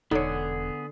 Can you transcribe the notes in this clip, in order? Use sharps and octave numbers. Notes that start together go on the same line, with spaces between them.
E1 D3 B3 D#4 G#4 C#5